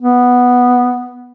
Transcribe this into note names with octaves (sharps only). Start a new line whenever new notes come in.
B3